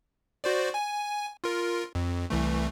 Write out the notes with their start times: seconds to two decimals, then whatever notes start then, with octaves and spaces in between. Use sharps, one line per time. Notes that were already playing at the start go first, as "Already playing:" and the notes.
0.44 F#4 C5 D5
0.74 G#5
1.44 F4 A#4
1.95 F2
2.30 C2 E3 A3